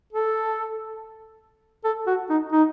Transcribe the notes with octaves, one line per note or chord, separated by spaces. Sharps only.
A4
A4
F#4
D#4
D#4